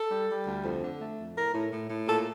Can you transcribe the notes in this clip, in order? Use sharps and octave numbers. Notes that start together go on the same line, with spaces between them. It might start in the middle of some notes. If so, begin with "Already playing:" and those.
Already playing: A4
G3
G3
D2
F2
D3
A3
F2
A2 A#4
A2
A2
A2
A#2 A4